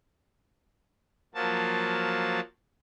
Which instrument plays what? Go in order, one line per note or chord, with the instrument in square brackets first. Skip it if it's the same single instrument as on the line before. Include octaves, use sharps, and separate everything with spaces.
[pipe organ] F3 F#3 A#3 A5